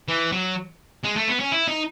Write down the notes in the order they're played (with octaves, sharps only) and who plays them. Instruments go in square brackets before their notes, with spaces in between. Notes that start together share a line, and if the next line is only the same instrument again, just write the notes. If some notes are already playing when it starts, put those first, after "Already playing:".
[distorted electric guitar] E3
F#3
G#3
A3
B3
C#4
E4
D#4